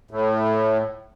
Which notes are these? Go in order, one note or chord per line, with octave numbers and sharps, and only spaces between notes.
A2